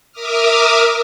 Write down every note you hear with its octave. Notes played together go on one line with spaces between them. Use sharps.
A#4 E5 D6 D#6 F6